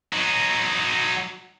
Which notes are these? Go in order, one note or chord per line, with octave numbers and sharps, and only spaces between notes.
F#3 D#4